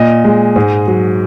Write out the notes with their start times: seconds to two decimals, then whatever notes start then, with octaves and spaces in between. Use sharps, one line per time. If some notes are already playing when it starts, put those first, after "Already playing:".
Already playing: A#2 D#5
0.25 G#3
0.56 G#2
0.87 F#3